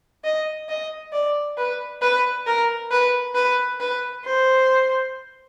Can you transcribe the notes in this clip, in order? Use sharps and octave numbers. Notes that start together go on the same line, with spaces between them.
D#5
D#5
D5
B4
B4
A#4
B4
B4
B4
C5